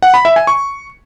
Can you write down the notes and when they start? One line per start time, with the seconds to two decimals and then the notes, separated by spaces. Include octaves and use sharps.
0.02 F#5
0.14 B5
0.25 E5
0.36 G#5
0.47 C#6